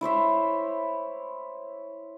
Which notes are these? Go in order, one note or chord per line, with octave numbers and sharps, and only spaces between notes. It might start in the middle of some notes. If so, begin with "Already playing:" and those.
E4 C5 C#5 E5